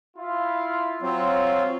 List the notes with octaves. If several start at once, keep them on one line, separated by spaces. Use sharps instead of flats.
E4 F4
F#3 C4 F4 C#5